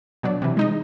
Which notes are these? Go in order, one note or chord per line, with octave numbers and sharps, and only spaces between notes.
B2 F#3 D4
C3 E3
G#3 D#4 D#5